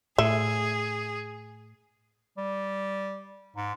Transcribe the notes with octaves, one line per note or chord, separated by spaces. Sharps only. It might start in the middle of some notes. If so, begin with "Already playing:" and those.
A2 G#4 E5
G3
G#2